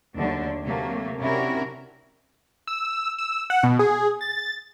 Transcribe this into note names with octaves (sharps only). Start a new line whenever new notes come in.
D#2 D3 F#3 A3 D4
C3 F#3 A3 A#3
C3 C#4 D4 E4 F#4 A#4
E6
E6
F#5
B2
G#4
A6